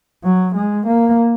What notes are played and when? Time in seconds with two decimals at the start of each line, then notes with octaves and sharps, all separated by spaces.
0.24 F#3
0.55 G#3
0.87 A#3